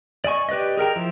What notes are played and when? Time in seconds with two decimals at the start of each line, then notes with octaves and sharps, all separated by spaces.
0.24 D5 D#5 G#5 C#6
0.49 G4 B4 D5 D#5
0.78 G#4 A#4 G5 A#5
0.96 F3 E4